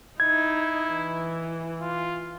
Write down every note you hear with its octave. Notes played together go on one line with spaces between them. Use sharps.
D#4 E4 G#6
E3
F4